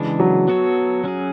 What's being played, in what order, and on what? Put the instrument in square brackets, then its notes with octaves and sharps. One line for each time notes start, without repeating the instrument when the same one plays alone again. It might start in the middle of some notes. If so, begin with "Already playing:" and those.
Already playing: [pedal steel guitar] C#3 E3 G#3 D4
[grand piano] F#3
[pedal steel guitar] F#3 B3 F#4 A4 C#5
F#3 C#4 G#4